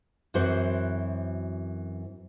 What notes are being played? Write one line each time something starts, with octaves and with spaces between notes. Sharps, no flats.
F#2 E3 C4 F#4 C5